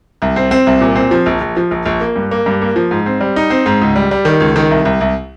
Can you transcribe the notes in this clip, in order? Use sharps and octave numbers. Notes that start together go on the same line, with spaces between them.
C2
C4
C4
C2
A#2
C4
F3
A#1
A#1
F3
A#1
A#1
A#3
G2
A#3
G2
A#3
F3
G#2
C4
G3
D#4
C4
G#2
C#2
G3
G3
D#3
C#2
D#3
C2
C2
C2